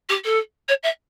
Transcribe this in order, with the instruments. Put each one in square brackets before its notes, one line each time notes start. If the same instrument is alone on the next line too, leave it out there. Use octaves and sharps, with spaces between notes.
[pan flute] G4
A4
C#5
E5